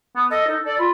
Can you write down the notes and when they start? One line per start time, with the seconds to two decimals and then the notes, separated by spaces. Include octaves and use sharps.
0.16 B3
0.31 A4 D#5
0.47 D#4 A4
0.65 A4 D5
0.79 F4 B5